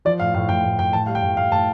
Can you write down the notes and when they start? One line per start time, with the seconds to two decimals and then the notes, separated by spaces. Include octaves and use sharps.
0.05 F3 D5
0.20 A2 F5
0.34 A2 F5
0.49 A2 G5
0.64 A2
0.79 A2 G5
0.93 A2 A5
1.06 G3 F5
1.15 G5
1.23 A2
1.37 A2 F5
1.52 A2 A5